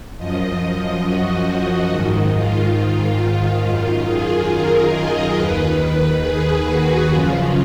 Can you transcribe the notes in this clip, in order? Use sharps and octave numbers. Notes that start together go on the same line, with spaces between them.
F#2 F3 D#5
D#5
F#4
G#2 D#3
F4
F4
F#2 D#3
G#4
A#4
D#5
D#2 D#3 B4
G#4
F#4
F#2 C#3 F3 F4